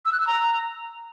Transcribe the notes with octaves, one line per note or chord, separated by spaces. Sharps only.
E6
F#6
E6
A#5